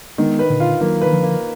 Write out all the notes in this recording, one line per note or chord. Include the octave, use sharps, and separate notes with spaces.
D#3 G#3 B3
B4
A#2 D3
F4
D#3 F#3 A#3
D#3 B4
D3 F3
A#3